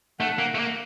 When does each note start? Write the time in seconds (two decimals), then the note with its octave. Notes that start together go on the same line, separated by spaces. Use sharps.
0.20 A3 F#5
0.39 A#3
0.55 A3
0.59 A#3